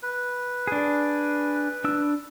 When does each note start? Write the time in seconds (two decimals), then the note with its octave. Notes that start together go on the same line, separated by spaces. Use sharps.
0.03 B4
0.67 D4 G#4
1.84 D4 E6